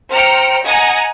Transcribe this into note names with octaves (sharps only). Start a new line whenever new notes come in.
C5 G5 A#5 F6 C#7 D7
D#5 F#5 G#5 A#5 D#6